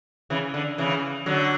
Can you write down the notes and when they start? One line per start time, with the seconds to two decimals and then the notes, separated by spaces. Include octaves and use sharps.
0.30 C#3 E3
0.54 D3
0.78 C#3 E3
1.26 D3 F#3